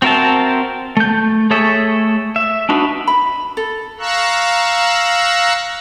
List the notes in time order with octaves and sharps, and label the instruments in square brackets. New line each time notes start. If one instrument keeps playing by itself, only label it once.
[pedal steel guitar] C4 F#4 A#4 E5 A5
A3 G6
A3 G#4 A4 C#5 E5
E5
D4 D#4 F#4 B4
[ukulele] B5
A4
[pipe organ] F5 A#5 C#6 E6 F#6